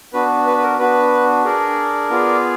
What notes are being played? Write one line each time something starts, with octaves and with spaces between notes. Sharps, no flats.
B3 D4 F#4 B4
B4
B4
A#4
B3 D4 F#4 B4
D4 G#4 A#4 D5
B3 F4 G#4